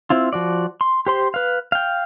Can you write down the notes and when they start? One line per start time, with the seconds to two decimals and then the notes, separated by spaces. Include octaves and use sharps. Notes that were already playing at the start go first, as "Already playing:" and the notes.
0.10 C4 E4 F4
0.33 F3 F#4 D5
0.81 C6
1.06 G4 C5 C6
1.34 B4 F5
1.72 F5 G5